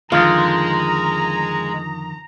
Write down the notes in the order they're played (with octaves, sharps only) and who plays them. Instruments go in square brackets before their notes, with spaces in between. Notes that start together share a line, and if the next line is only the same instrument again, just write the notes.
[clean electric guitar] F2 D3 D#3 [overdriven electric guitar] G#3 [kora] F4 [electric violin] A#5